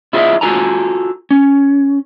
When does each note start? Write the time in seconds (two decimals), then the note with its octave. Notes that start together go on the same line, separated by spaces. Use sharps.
0.13 E4 F4 G#4 C5 D#5 E5
0.41 F4 F#4 A4 G#5 A#5
1.31 C#4